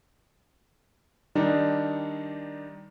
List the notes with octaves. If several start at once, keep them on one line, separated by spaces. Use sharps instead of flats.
D#3 G3 D4 D#4